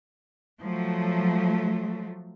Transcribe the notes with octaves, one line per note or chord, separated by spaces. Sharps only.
F3 F#3 A3